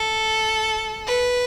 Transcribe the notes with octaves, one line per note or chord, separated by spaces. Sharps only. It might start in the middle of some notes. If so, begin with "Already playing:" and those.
Already playing: A4
B4